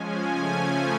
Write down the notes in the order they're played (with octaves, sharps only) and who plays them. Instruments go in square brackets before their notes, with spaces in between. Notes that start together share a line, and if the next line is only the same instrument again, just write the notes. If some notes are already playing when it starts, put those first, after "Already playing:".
Already playing: [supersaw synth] F3 G#3 C#4 G#5
C#3 F3 A3 C#4